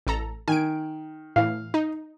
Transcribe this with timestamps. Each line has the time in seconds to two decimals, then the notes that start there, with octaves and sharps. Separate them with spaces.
0.07 A1 A4 A#5
0.48 D#3 G#5 D7
1.36 A2 E3 F5
1.74 D#4